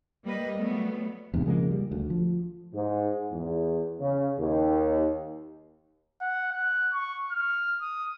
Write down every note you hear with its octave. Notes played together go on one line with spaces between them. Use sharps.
G3 A#3 B4 D#5
F#3 G3 A3 B3
E2 G#2 C3
C#3 F3 G#3 A#3
G3
D2
F3
G#2
E2
C#3
D#2
F#5
F#6
C#6
F6
D#6